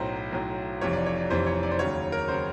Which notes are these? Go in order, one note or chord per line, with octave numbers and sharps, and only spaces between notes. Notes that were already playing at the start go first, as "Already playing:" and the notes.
Already playing: B1 A2 F#3 C5
B1 A2 F#3
F1 F2 C3 E3 C#5
D5
C#5
D5
F1 F2 C3 E3 C5
C#5
D5
C5
D#2 C#3 F#3 C#5
A#4
C#3 F#3 C5